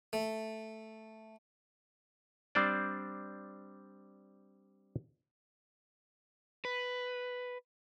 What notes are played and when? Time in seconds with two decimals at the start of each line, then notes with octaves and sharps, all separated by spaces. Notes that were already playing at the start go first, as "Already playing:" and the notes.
0.13 A3
2.55 G3 C4 D4 C5 D5
6.65 B4